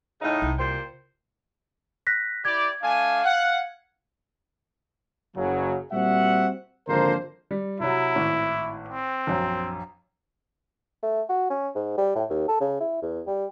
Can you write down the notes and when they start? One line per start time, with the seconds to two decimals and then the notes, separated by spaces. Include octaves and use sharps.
0.21 A2 C#3 D#4
0.42 C2
0.58 A#2 G4 C5
2.07 F#6 A#6 B6
2.45 E4 G4 D5 G#6
2.83 A3 D4 F5 G#5
3.24 F#5
5.37 F#1 C#3 F#3
5.93 A#2 G3 C4 F#4 E5 F#5
6.89 G#1 D3 F3 A#3 A#4 C5
7.51 G3
7.80 C3 F#3 E4
8.16 G#1 A2
8.88 C4
9.27 A#1 F#2
11.03 A3
11.29 F#4
11.50 C#4
11.75 G#2
11.98 G3
12.15 A2
12.30 D#2
12.49 A4
12.61 C#3
12.80 E4
13.02 E2
13.27 G3